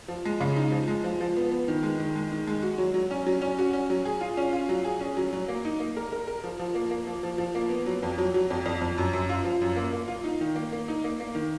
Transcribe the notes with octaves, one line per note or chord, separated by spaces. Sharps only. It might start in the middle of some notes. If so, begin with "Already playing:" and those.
F3
G#3
C#3
D#4
F3
G#3
F3
F3
B3
B3
D#3
G#3
D#3
G#3
D#3
G#3
F#4
F#3
F#3
C#4
F#3
C#4
F#4
C#4
F#3
G#4
F4
C#4
F4
F#3
G#4
C#4
F#3
F#3
A#3
D#4
A#3
A#4
A#4
A#4
F3
F3
A#3
A#3
F3
F3
F3
A#3
B3
F#3
F2
F#3
F#3
F2
F2
F2
F#2
F#2
F4
F3
F#2
A#3
A#3
F4
D#4
D#3
A#3
A#3
D#4
A#3
A#3
D#3